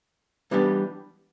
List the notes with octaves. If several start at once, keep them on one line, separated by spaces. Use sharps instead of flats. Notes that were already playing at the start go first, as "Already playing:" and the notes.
E3 G3 B3 D4 G4